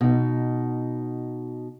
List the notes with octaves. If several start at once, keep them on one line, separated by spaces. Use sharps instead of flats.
B2 D#4